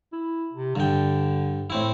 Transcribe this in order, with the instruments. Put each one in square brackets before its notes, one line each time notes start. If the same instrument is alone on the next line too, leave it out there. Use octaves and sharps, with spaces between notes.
[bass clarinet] E4
C3
[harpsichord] G2 G5 [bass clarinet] D3
[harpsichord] A2 C4 E4